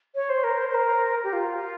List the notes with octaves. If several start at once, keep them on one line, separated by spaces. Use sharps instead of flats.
C#5
C5
A#4
C5
C5
A#4
G4
F4